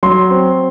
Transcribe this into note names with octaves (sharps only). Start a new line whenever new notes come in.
F#3 C6
C4